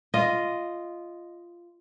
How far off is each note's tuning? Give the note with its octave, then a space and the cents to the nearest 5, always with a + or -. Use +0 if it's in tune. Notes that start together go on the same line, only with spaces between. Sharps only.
F4 -10 D#5 +0